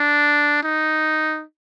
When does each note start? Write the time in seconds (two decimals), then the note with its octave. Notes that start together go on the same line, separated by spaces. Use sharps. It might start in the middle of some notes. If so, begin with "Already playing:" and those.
Already playing: D4
0.63 D#4